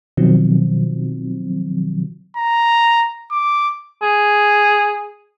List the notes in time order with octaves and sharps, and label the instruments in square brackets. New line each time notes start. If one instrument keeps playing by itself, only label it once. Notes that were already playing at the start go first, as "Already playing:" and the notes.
[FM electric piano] B2 D#3 F3 F#3 C4
[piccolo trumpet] A#5
D6
[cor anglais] G#4